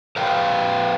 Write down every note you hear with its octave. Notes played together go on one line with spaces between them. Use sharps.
A#4 B4 F5 G5